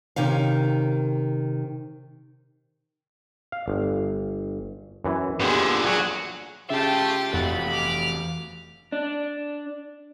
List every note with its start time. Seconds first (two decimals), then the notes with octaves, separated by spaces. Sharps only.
0.16 C3 D#3 C#4 F5
3.52 F5
3.68 G1
5.04 F#2 E3
5.40 A#2 D3 B3 G4 G#4
5.86 F#3 F#4 G#4 F#5
6.70 C#3 F4 G4 E5 G5 A5 A6
7.33 F1 E3 F#4 B5
7.71 D6 F6
8.92 D4